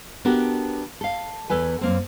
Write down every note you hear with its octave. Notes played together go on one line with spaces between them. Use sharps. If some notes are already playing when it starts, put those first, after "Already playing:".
B3 D4 F#4 G4 A4 A#4
A4 F5
E2 A4 B4 G#5
F#2 A#3 C4